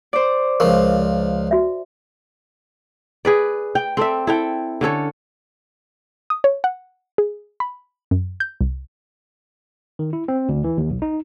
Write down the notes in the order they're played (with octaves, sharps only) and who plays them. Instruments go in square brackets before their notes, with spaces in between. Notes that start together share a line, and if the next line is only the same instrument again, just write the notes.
[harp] C5 D5
[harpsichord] C#2 F3 [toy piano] A#4 C#6
[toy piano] F#4 E5
[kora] G#4 B4 D5
G5
C4 A4 D5 E5
E4 A4 G5
D3 C#4 A4 C#5
[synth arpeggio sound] D#6
C#5
F#5
G#4
B5
F#2
G6
C2
[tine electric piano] D#3
E4
C4
D2
E3
D#2
B1
D#4